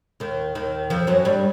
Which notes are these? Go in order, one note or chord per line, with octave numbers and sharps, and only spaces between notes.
D#2 D#3
D#2 D#3
F2 F3
F#2 F#3
G2 G3